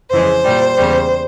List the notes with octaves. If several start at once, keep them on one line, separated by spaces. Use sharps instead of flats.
F2 C#3 E3 G#3 C5
A#2 G3
E2 C#3 G3